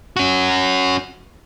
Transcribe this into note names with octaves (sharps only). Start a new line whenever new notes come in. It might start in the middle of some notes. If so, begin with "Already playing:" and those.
C#4 F#4